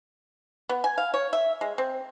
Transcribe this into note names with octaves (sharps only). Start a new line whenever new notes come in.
B3
G#5
F5
C#5
E5
G#3
C4